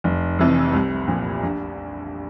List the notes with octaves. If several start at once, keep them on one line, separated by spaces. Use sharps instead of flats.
F1
F2 C3 E3
C2
A#2 F3
A#1